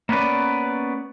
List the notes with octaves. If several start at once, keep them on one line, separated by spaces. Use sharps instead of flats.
A#3 B3 C#4 B4 D5